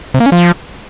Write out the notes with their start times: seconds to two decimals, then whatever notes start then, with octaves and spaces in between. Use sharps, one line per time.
0.14 C3
0.20 A#3
0.26 C#4
0.32 F3